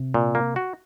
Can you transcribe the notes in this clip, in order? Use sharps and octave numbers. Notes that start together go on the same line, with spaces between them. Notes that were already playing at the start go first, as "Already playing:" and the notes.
Already playing: C3
A#2
A#3
F#4